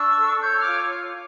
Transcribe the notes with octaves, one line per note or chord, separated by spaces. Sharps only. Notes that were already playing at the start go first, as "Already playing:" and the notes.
Already playing: D4 C#6 E6
A4
C#5 E6 G6
D6 F6
F4